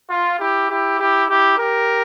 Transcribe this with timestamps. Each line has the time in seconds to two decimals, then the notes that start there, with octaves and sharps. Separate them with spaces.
0.09 F4
0.39 E4 G4
0.70 E4 G4
0.99 E4 G4
1.28 E4 G4
1.58 G4 A#4